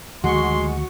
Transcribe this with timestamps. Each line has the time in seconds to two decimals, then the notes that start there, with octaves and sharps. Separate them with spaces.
0.24 D2 D#3 F3 G#3 F#4 C6 C#6